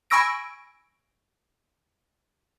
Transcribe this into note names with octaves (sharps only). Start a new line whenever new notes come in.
G#5 B5 C#6 E6 A#6 D7